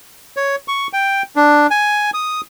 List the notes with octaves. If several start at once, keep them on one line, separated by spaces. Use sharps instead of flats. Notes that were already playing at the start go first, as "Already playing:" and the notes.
C#5
C#6
G5
D4
G#5
D#6